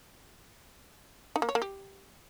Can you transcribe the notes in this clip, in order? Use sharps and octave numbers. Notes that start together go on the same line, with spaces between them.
D#4
A#3
C#5
A#3
G4